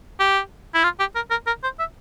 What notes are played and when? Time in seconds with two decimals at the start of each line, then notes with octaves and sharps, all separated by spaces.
0.20 G4
0.74 E4
0.84 F4
1.00 G4
1.15 A#4
1.31 A#4
1.47 A#4
1.63 C5
1.79 E5